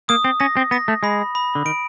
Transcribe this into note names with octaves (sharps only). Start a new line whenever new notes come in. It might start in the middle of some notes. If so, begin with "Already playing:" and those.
A#3 D#6
C4
C#4 A#6
C4
B3 A#6
A3
G#3 B5
B5
D3
D#3 D7